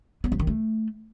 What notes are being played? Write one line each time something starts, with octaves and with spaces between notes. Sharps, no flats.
B3
F3
D#3
A3